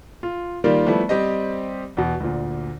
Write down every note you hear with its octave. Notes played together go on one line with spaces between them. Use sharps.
F4
D#3 G3 A#3 F4 G4 D5
F3 G3 A3 B3 E4
G3 C4 G4 C5 D#5
E2 B2
D2 A#2